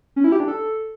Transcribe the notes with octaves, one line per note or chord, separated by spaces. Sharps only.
C#4
E4
G4
D4
A4